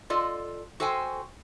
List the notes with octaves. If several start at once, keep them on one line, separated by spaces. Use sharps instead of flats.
F4 A4 D5 D#5
F#4 A4 C5 G5 G#5